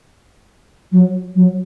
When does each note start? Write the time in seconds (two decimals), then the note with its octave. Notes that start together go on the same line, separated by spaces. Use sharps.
0.92 F#3
1.35 F#3